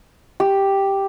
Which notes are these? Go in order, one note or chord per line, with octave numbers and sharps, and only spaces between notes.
G4